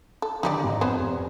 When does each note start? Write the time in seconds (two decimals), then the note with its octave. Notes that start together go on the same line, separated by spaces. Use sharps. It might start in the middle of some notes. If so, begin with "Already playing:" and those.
0.22 A4
0.43 D3 D#3 D#4 G4 D5
0.64 G#1 G#2 A#5
0.81 F2 B3 C#4 C5
0.96 F1